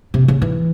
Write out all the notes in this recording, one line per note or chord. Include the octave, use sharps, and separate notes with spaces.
C3
C#3
E3